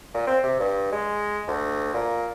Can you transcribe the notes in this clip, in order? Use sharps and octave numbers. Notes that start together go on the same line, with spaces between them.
A#2
C4
C3
G2
G#3
D2
A#2